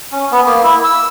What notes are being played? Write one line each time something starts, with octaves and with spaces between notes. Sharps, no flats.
C#4
B3
A#3
E4
E6